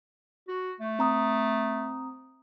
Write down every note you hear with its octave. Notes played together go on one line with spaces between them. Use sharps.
F#4
A3
C4 A#5 D#6